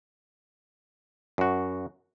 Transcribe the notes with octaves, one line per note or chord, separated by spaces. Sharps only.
F#2 F#4